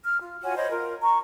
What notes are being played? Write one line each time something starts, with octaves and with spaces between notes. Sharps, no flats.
F6
F4
F4 F#4 C#5 G#5
C5 C#5 D#5 B5
F4 A#4
A#5 C#6